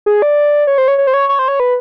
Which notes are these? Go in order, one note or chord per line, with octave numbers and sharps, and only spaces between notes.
G#4
D5
C#5
C5
C#5
C#5
C5
C#5
C#5
C5
C#5
B4